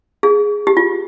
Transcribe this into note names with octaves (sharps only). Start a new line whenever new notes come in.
G#4
G4
F4